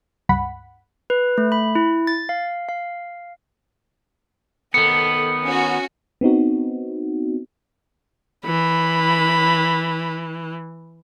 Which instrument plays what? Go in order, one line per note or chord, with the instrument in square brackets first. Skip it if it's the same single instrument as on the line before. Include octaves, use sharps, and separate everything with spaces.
[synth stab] C#2 G2 F#5 B5
[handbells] B4
A3
B5
E4
A6
F5
F5
[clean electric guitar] D#3 B3 [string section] A4 [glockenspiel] C#7
[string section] C#4 F#4
[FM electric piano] B3 C4 D#4 F#4
[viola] E3 [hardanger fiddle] B5